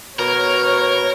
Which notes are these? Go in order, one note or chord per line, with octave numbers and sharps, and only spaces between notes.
B2 A#4 C#5